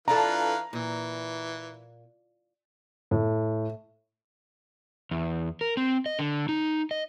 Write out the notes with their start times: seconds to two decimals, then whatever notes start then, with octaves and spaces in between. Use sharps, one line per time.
0.08 E3 D4 F4 A4 B4 F5 A#5
0.73 A#2 E3
3.11 A2
5.11 E2
5.61 A#4
5.77 C4
6.06 D#5
6.19 D3
6.49 D#4
6.91 D#5